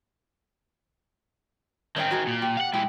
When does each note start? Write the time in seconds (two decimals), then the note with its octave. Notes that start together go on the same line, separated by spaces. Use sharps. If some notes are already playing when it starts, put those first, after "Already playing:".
1.96 D#3 C4 C#4 D#5 G5
2.11 F#4 G#4 A#5
2.27 A#2
2.42 G4
2.57 F5 F#5
2.74 G#3 E4 G4